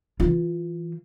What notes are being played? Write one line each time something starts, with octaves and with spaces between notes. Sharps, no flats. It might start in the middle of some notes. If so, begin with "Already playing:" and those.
E3 F4